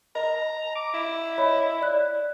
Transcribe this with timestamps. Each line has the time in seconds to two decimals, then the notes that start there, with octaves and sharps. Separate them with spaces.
0.15 D#5 A#5
0.76 D6
0.94 E4
1.38 C#5 D#5 B5
1.82 D5 F#6